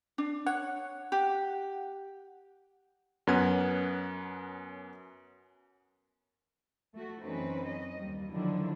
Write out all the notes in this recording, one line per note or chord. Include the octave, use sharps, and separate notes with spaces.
D4
C#5 F#5
G4
F#2 B3 C#4 B4 F#5 G#6
A3 F#4
F#2 E3 C4 C#4 D#4 B4
D#5
D#2 G3
D3 D#3 F3 F#3 D4 E4